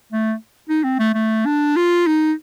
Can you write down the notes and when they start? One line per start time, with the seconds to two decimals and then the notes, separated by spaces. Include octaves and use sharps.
0.12 A3
0.69 D#4
0.84 C4
0.99 A3
1.14 A3
1.46 D4
1.76 F4
2.07 D#4